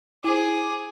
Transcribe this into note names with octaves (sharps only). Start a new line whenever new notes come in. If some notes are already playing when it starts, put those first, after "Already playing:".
E4 G#4 C5 D6